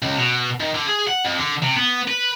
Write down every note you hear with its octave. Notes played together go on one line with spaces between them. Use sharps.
C#2
B2
D#3
D3
G#4
F#5
F2
D3
C3
B3
B4